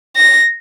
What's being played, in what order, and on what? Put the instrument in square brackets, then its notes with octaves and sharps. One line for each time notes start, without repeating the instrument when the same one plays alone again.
[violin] A#6